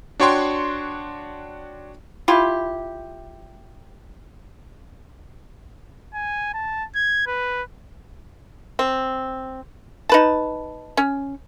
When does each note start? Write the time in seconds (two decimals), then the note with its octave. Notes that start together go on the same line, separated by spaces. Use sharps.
0.20 D4 F#4 C#5 G5 C6 C#6
2.28 E4 F4 G4
6.14 G#5
6.54 A5
6.95 G#6
7.27 B4
8.79 C4
10.09 D#4 B4 A5
10.97 C#4